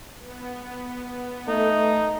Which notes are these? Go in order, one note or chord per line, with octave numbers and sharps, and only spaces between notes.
B3
A3 D#4